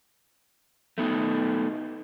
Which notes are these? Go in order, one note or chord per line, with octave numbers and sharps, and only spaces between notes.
A3 B3 D#4